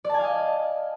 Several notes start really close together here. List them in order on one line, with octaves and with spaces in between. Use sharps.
D5 A5 G#5 F5 D#5